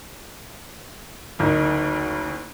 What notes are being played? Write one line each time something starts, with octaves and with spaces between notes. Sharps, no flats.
F#1 D2 D#4 A#4